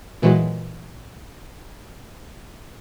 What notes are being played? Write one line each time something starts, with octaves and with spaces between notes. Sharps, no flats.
A#2 E3 F#3 G#3